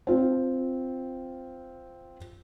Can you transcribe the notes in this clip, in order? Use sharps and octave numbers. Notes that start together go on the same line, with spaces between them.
C4 F4